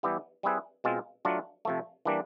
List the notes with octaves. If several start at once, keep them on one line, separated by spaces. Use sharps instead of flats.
E3 G3 B3 E4 G4
G3 C4 E4 G#4 B4
B2 G#3 C4 F4
F#3 A3 D4 F4
C3 F3 A3
E3 G3 A#3 D4